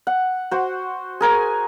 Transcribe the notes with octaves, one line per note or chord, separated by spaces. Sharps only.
F#5
F#4 C5
G#4 A#4 G#5